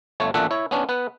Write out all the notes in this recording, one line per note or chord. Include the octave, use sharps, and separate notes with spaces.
G1 A3 C#5
A1 A#2 A3 D4 E5 F#5
E4 C#5
B3 C#4 D4
B3 B4